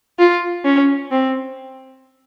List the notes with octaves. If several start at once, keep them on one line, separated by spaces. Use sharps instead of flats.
F4
C#4
C4